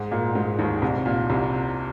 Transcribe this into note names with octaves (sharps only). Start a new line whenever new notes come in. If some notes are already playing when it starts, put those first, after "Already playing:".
Already playing: G#2 G#3
A#2 A#3
G#2 G#3
D#2 D#3
C2 C3
A#2
C2 C3